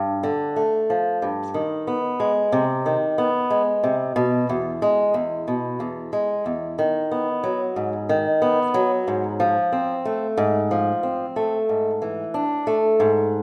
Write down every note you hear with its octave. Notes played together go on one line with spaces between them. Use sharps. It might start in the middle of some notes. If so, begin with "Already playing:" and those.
Already playing: G2
D3
A3
F3
G2
D#3
B3
G#3
C3
D#3
B3
G#3
C3
B2
E2
G#3
E2
B2
E2
G#3
E2
D#3
B3
F#3
G#2
D#3
B3
F#3
G#2
F3
C4
A3
G#2
F3
C4
A3
G#2
E3
D4
A3
G#2